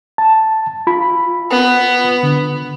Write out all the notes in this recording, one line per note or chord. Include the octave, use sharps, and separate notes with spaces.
A5
F4 B5
B3
D3